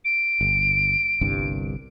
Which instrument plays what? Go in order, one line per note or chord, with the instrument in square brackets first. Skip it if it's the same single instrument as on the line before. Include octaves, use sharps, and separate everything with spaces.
[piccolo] D7
[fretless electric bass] G1
G1 C2 G2